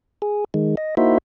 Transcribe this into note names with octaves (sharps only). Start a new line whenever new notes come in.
G#4
D#3 G#3
D#5
A#3 D#4 E4 F#4 C5 E5